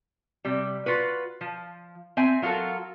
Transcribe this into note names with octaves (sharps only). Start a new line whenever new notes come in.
C3 G3
F4 F#4 B4
F3
C4 E5 G#5
F#3 F4 F#4 A4 A#4